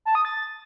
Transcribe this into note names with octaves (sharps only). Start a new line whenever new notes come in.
A5
D#6
A6